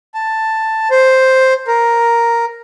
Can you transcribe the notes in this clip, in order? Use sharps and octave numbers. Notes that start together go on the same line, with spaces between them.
A5
C5
A#4